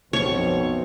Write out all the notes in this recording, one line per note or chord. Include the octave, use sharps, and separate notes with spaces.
B1 F2 B2 C4 C#5 C#6